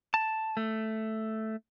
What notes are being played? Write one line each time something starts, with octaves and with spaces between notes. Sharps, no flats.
A5
A3